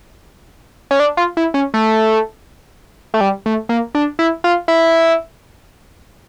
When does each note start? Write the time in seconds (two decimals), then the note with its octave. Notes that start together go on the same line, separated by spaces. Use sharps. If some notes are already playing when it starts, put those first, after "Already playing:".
0.91 C#4
1.00 D4
1.17 F4
1.37 E4
1.54 C#4
1.74 A3
3.14 A3
3.21 G3
3.46 A3
3.69 A#3
3.95 D4
4.19 E4
4.44 F4
4.68 E4